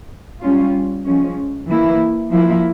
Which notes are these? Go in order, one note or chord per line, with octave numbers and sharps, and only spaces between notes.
G3 C#4 F4
F3 G#3 C#4
E3 A#3 E4
F3 A#3 E4